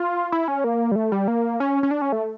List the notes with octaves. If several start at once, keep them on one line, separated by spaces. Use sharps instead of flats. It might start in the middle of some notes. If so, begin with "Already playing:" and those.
Already playing: F4
E4
C#4
A#3
G3
A3
G3
A#3
C#4
C#4
D4
C#4
A3